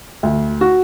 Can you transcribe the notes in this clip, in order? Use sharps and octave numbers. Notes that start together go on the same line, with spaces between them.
D2
F#4